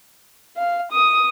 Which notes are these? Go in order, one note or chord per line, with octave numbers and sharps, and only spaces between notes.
F5
D#6